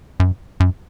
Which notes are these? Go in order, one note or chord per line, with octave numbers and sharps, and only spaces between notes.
F#2
F#2